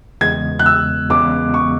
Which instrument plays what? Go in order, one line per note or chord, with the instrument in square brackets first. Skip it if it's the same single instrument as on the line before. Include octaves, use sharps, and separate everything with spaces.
[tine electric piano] E2 C#3 G#3 B3 [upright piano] G#6
[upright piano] F#6
E6
[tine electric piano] E2 C#3 G#3 B3 [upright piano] D6
[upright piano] C#6